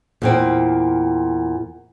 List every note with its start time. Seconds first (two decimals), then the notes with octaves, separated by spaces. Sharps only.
0.22 E2 A#2 C4